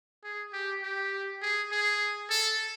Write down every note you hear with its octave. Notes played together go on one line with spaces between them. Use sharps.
G#4
G4
G4
G#4
G#4
A4